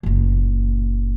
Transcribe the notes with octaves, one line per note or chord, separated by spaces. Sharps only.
F#1 A#2